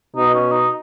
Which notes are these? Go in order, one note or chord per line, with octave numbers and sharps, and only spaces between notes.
B2 D#4
C#4
D#4